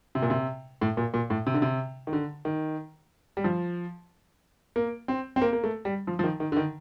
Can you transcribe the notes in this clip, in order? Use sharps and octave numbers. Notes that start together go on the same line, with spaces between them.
C3
A#2
C3
A2
A#2
A#2
A2
C3
D3
C3
D#3
D3
D#3
G3
F3
A#3
C4
C4
A#3
A#3
A3
G3
F3
F3
D#3
D#3
D3
D#3